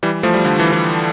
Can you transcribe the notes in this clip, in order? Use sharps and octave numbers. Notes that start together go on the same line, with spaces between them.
E3 G3
F3 A3
G3
D3 F3
E3
E3